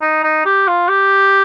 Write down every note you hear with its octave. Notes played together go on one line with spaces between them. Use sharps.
D#4
D#4
G4
F4
G4